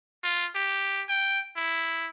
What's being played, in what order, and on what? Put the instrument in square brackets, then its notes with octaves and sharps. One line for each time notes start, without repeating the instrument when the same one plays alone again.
[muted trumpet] F4
G4
G5
E4